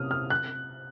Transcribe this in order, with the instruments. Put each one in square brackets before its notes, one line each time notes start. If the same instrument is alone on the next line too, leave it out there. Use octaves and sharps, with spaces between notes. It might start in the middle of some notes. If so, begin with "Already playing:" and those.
Already playing: [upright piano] C3 A#3 C#4 D#6 F6
F6
F#6